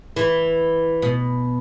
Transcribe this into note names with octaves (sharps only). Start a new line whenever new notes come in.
E3
B2